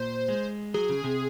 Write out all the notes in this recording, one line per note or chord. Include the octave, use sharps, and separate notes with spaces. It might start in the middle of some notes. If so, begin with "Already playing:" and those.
Already playing: A#2 C5
G#3
F#3 G#4
C#3
C3